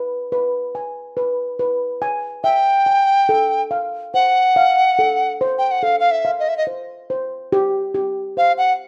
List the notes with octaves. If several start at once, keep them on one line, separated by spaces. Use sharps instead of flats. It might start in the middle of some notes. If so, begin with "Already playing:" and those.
Already playing: B4
B4
G#5
B4
B4
G#5
E5 G5
G#5
A4
F5
C5 F#5
F5
A4
C5
G5
F#5
A4 F5
F5
E5
F5
D#5
E5
D#5
C5
C5
G4
G4
C5 F5
F#5